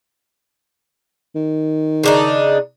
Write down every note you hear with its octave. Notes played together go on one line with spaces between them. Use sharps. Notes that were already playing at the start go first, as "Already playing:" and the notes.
D#3
C#3 D4 D#4